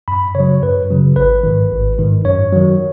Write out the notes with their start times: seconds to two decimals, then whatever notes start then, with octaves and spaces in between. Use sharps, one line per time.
0.08 F#2 B5
0.35 C#3 F#3 C#5
0.62 F#2 B4
0.90 C#3 F#3
1.16 G#1 B4
1.44 G#2 D#3
1.71 G#1
1.99 G#2 D#3
2.25 F#2 C#5
2.52 D#3 F#3